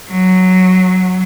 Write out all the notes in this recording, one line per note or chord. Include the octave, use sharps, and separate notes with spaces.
F#3